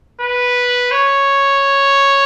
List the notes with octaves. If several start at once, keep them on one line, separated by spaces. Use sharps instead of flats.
B4
C#5